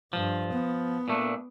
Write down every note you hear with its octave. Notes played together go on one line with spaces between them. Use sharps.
G2 F3
B3
A#2 A3 D4